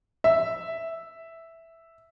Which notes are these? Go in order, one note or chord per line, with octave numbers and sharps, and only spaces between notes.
E5